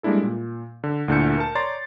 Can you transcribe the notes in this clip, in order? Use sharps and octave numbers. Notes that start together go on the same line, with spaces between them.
G3 G#3 A#3 D4 E4 A4
A#2
D3
D2 A#2 D3 E4 G6 C#7
A#4 A5
C#5 D5 A#5 C6 A6 C7